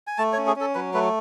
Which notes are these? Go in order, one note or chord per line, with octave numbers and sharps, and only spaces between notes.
G#5
A3 A5
C#5
C#4
G#4
C#4 A4
F#3 B4
A3 B4